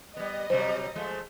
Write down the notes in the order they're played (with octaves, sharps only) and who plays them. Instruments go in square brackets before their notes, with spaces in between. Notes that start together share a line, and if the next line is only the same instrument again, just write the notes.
[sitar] G3 B3 [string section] D#5
[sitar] C3 F#3 G3 [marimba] C5
[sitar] F3 G#3 A3